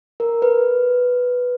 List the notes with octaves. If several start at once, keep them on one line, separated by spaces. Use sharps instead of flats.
A#4
B4